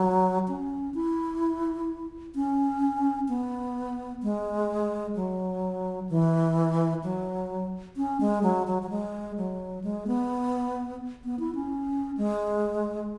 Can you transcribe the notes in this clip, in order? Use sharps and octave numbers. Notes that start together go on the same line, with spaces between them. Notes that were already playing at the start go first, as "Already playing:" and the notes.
Already playing: F#3
C#4
E4
C#4
B3
G#3
F#3
E3
F#3
C#4
G#3
F#3
F#3
F#3
G#3
F#3
G#3
B3
B3
E4
C#4
G#3